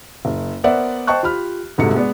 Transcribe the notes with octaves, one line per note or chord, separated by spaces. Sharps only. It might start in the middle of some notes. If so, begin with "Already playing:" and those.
F#1
B3 A#4 C5 D5 E5 F#5
C5 D#5 G5 A5 C#6 F#6
F4 G4 B5 F6
G1 G#2 C3 F#4 A4 C#7
G#3 B3 D5